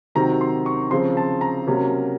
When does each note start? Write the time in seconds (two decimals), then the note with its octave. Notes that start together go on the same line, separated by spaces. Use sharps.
0.15 C3 D#3 F#3 C4 A#5
0.41 C6
0.66 C#6
0.91 C#3 F3 C4 C6
1.17 A5
1.41 A#5
1.67 C3 F#3 A#3 C#4